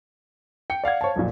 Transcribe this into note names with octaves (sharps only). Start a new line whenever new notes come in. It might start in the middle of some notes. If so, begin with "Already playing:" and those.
G5 C#7
D5 F5 F#5 G#6
C5 C#5 F5 A5
B1 F2 A#2